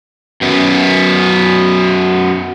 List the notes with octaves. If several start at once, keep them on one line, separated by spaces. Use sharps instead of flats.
F#2 B3